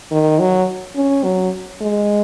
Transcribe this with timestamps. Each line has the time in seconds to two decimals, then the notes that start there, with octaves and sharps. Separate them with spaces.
0.11 D#3
0.39 F#3
0.96 C#4
1.24 F#3
1.81 G#3